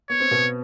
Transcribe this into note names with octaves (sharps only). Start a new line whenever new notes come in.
B3 C#5
C4
B2 B3